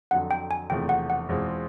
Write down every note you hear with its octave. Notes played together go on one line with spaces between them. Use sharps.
F2 D3 F#3 F#5
G5
G#5
E1 E2 C3 F3 A3 G5
F#5
F#5
E2 B2 G#3 C4 F4